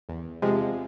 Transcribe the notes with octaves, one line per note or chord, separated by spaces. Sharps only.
E2
C3 F3 G#3